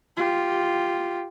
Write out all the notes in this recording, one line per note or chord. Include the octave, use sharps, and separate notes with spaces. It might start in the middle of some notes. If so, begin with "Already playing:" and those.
F4 G4